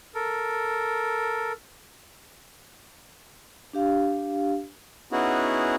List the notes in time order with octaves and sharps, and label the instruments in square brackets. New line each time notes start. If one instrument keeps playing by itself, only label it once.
[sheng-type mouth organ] A4 A#4
[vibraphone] D4 G4 F5
[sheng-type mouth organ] B3 C#4 D#4 E4 F#4 G#4